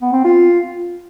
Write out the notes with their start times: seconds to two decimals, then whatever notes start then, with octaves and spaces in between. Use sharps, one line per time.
0.01 B3
0.13 C4
0.24 F4